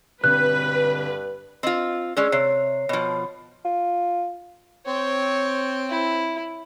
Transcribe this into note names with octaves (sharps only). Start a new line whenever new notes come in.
G2 B2 D3 C4 B4 F#6
C4 F4 D#5
G#3 C#4 G#4 D5 E6
C3 C#5 C7
B2 F3
F4
C4 C#5
E4